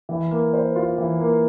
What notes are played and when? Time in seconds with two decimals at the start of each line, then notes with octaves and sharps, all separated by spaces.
0.09 E3
0.31 A#3
0.53 C5
0.76 F4
0.98 E3
1.21 A#3